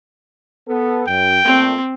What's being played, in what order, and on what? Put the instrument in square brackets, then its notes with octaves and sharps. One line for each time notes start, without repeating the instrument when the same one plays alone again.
[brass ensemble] B3 A4
[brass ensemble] F#2 [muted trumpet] G5
[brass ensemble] A#2 A3 [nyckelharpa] C4